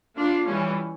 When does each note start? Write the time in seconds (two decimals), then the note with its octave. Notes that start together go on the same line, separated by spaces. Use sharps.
0.17 D4 F4
0.46 E3 G3 C#4